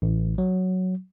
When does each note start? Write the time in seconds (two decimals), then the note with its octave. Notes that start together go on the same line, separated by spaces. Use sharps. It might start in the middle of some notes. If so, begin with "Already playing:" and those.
0.02 A1
0.38 F#3